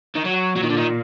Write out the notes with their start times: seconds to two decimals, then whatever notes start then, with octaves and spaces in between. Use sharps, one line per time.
0.15 D#3
0.25 F#3
0.56 A#2 F#3
0.63 D#3
0.70 D3
0.77 D#3